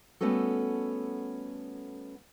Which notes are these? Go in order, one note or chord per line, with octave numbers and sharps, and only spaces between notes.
G3 A3 B3 C#4 F#4 A4